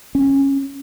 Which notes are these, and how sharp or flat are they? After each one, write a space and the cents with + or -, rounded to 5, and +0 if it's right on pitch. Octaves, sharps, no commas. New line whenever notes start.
C#4 -15